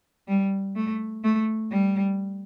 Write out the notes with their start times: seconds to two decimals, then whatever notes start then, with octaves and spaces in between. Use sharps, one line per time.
0.28 G3
0.75 A3
1.24 A3
1.71 G3